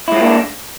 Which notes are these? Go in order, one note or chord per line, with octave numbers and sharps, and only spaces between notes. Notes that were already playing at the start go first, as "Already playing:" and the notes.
G#3 A#3 D4 E4 F4